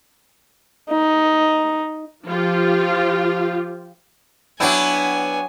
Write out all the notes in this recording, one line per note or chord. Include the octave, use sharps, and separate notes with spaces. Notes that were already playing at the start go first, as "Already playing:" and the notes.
D#4
F3 F4 G4
F#3 B3 D4 E4 G5 G#5